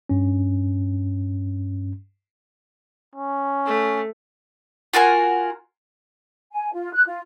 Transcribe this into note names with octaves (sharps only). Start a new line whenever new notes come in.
G2 C#4
C#4
A3
F4 F#4 A#4 G#5
G#5
F4
F#6
F4